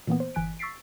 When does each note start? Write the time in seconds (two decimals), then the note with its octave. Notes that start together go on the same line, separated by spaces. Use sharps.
0.07 A#2 E3 A#3 B3
0.20 C5
0.35 G1 E3 G#5 F#6 B6 D7
0.59 C#6 E6 A6 B6 C7 D7